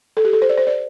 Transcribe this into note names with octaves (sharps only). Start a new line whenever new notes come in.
A4
G4
A4
C5
D5
C5
D5